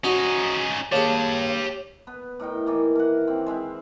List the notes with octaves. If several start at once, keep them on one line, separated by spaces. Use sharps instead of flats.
C#4 D#4 F#4 D#5
D#2 G4 G#4 C#5 A5
B3 B4
A2 D#4 A#4 G5
D#3 E3 A#3
A#4 F#5
C4
G#3 C4 E4 E5